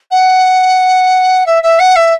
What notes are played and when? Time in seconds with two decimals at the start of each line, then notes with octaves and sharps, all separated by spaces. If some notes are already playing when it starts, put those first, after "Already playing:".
0.11 F#5
1.46 E5
1.62 E5
1.79 F#5
1.95 E5